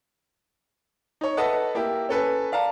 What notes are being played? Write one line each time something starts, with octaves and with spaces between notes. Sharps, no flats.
D#4 C#5
A4 B4 D#5 E5 F#5 A5
A#3 E4 G4
C#4 A4 B4 G#5
D5 F5 A5 A#5